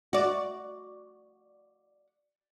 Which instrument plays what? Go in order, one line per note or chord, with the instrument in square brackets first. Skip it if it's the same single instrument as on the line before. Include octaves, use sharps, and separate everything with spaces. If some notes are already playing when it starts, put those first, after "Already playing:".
[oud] F#4 D5